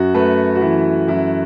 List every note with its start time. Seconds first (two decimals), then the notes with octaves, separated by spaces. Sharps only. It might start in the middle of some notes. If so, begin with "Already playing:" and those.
Already playing: F#2 F#4
0.14 A3 B4
0.55 F#4
0.61 E3 E4
1.08 F#2 E4